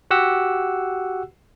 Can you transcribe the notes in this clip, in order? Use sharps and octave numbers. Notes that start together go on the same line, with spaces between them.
F#4 G4 F#5 E6